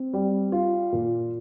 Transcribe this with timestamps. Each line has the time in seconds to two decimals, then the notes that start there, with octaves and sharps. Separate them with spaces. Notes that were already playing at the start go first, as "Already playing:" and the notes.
Already playing: C4
0.13 G3
0.52 F4
0.92 A#2